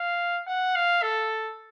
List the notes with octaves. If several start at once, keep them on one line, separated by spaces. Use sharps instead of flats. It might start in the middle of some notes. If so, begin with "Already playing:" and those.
Already playing: F5
F#5
F5
A4